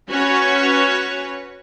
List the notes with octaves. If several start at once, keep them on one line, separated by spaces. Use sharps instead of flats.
C#4 F#4 B4 C#5